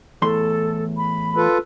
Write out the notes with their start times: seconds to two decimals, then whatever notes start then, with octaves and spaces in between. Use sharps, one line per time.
0.22 E2 A2 A4 C6
0.96 B5
1.36 F4 A4 B4